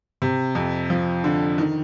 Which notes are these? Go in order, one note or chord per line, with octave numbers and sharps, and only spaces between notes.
C3
F2
F3
D3
D#3